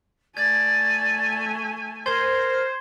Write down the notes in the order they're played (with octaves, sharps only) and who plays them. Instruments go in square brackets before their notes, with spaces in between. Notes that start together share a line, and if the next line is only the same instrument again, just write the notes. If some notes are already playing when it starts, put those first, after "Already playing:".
[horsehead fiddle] A3 G#5 [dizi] D5 [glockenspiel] G#6
[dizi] A#4 [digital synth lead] C5 [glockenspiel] C6 G#6 G7